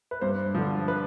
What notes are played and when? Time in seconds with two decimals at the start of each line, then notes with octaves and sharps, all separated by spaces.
0.11 B4
0.21 G2 C5
0.55 D3 F3
0.88 B4